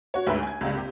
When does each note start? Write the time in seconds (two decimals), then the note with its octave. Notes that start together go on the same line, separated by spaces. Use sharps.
0.14 F#4 C#5
0.27 D2 G#2 B4 E5
0.43 G#5 G#6
0.61 C#2 G2
0.73 C3 G4